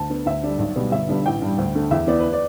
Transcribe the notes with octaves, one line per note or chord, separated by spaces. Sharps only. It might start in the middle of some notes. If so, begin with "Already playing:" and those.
Already playing: D2 A5
D3 B3
D2 E5
D3 G3 D5
B1
B2 G3 B3
G1 E5
G2 D3 G3 B3
A1 G5
G2 G3
D2
D3 A3
E2 E5
E3 B3 D5
B4
D5